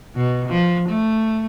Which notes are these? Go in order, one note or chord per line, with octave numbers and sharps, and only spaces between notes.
B2
F3
A3